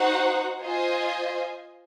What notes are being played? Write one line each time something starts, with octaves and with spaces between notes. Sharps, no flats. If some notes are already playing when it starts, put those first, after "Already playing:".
Already playing: D#4 F#4 C5 F#5
F4 C5 D#5 G#5